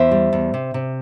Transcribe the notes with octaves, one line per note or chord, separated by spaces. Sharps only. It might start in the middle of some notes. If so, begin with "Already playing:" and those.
Already playing: E2 C5 E5
G3
E2
C3
C3